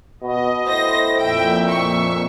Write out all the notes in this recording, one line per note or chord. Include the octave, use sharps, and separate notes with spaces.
B2 D#5
A2 C5 A#6
F2 A#2 E5 G5
C#6